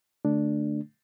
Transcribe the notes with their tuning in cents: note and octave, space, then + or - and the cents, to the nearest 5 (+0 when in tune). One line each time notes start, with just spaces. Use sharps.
D3 +0 A3 +0 D4 +0